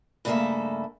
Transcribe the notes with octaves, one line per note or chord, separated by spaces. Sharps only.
G2 C#3 F#3 A3 A#3 E5